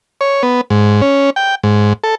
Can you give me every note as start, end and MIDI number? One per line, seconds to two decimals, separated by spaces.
0.21 0.43 73
0.43 0.61 59
0.70 1.01 44
1.02 1.30 61
1.36 1.55 79
1.63 1.93 44
2.04 2.15 69